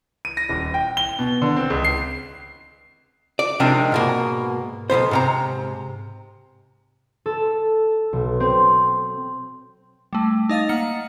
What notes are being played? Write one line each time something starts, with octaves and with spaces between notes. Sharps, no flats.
D#7
A#6
D#1
G5
G7
B2
D3
C4
C#2
C7
D5
C3 D#3 F3 G#3 D4
G#2 B2 A#3
B1 G#2 B3 C5
G#2 C3 A#5
A4
B1
C4
G3 A3
D#4 D#5 F5 A6
A#3 F#5 C#7